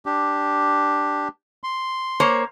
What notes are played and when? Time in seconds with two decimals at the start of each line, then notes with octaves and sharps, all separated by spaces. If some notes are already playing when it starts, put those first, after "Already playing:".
0.06 D4 G4
1.64 C6
2.20 A#3 C5 C#5